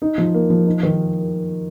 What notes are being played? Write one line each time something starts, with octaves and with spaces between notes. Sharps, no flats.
D#4
F3
A#3
F3
D#4
D#3